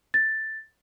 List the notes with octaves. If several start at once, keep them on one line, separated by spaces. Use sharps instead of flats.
A6